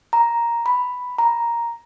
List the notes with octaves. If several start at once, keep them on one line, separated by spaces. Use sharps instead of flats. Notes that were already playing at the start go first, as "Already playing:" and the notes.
A#5
B5
A#5